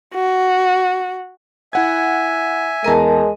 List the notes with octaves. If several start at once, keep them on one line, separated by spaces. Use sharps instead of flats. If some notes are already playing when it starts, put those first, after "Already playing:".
F#4
E4 E5 F#5 G#5 G#6
E2 G#3 A#4 A5 A#5 D#7